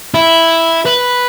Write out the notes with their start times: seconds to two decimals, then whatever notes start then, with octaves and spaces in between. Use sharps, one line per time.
0.14 E4
0.86 B4